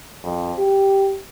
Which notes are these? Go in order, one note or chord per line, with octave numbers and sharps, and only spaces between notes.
F2
G4